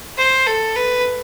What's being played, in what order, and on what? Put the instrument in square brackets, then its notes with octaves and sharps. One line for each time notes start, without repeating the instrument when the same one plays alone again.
[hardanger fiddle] C5
A4
B4